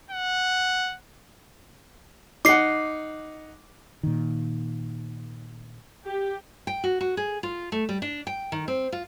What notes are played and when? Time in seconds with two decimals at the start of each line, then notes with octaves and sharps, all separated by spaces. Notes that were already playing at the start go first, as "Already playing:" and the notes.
0.11 F#5
2.45 D#4 F#5 D6 C7
4.03 A#2 D#3
6.04 G4
6.67 G5
6.84 F#4
7.01 F#4
7.17 G#4
7.43 F4
7.72 A3
7.89 G3
8.02 D4
8.27 G5
8.52 D#3
8.68 C4
8.92 F4